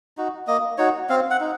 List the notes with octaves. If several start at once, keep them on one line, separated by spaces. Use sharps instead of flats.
D#4 F#4
A#3 D#5
D#4 F#4 C#5
C4 F5
F#5
D#4